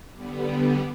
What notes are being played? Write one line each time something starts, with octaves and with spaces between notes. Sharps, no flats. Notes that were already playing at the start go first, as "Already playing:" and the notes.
D3 G3 B3